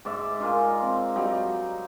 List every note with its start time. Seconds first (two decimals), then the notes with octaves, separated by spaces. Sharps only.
0.05 G#2 D5 E5
0.40 D#4 F4 G#4 A#4
0.82 C4
1.16 F#3 G3 D#4